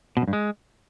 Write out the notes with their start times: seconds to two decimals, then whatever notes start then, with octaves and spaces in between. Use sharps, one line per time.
0.17 B2
0.22 F#2
0.28 G2
0.33 G#3